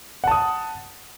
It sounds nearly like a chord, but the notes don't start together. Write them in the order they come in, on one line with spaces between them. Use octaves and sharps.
F#5 A5 D#6